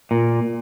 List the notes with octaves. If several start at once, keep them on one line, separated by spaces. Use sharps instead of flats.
A#2